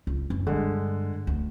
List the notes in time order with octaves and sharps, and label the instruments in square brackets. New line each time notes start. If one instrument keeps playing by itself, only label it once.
[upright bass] C#2
F#1 E2
[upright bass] G2 [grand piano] D3 G#3
[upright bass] D2